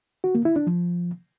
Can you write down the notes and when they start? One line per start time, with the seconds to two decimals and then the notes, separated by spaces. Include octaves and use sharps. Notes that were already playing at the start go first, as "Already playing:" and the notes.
0.24 F#4
0.35 A#3
0.45 E4
0.56 D4
0.67 F3